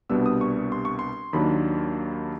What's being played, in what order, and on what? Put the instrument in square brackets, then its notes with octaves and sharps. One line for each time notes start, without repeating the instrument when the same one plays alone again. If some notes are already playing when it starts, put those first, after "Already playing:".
[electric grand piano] C2 B2 G3 B3 D4 E6
D#6
C#6
C6
C#6
C6
D#2 D#3 F#3 A#3 D4 B5